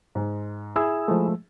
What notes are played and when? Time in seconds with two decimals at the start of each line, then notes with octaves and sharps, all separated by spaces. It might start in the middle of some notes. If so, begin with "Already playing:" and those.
0.15 G#2
0.76 E4 G#4 E6
1.08 F3 G#3 A3